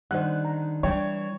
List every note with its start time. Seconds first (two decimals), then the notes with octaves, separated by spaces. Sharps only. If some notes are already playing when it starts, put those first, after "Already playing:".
0.11 D3 D#3 G3 C5 F#5 F#6
0.45 A#5
0.83 E3 G3 D4 C#5 G5 C#6